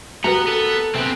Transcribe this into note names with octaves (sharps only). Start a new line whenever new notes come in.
B3 F#4 G4 A#4 B4 A#5
B3 A4
C3 B3 C4 B4 G#5